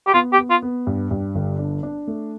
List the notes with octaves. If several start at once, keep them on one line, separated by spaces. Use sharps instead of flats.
G4
B3 F4
G4
B3
F4
B3
G2
G2
G1
D4
D4
A3